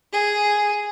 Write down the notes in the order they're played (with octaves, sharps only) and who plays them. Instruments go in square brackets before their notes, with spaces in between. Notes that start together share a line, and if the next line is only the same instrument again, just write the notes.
[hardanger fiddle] G#4